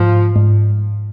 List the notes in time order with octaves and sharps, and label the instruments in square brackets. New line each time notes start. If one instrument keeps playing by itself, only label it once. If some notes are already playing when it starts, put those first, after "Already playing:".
Already playing: [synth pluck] G#2 [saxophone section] F3
[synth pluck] G#2